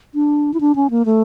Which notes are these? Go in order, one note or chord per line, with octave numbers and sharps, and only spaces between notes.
D4
E4
D4
C#4
A#3
A3